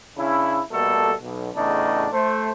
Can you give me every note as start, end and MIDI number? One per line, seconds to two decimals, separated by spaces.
0.17 0.60 49
0.17 0.60 61
0.17 0.60 62
0.17 0.60 64
0.71 1.13 47
0.71 1.13 55
0.71 1.13 57
0.71 1.13 58
0.71 1.13 69
1.21 1.49 35
1.54 2.06 40
1.54 2.06 45
1.54 2.06 49
1.54 2.06 62
1.54 2.06 63
2.13 2.51 57
2.13 2.51 72